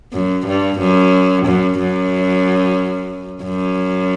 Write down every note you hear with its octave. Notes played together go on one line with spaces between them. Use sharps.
F#2
G2
F#2
F#2
F#2
F#2